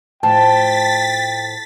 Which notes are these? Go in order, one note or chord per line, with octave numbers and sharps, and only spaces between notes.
A2 F3 G5 A5 A6 B6